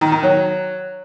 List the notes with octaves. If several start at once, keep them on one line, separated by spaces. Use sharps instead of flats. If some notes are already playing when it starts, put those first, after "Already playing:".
D#3
D#3
F#3